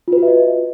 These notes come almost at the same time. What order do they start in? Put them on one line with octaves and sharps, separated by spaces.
F4 B4 F#4 E5 D#5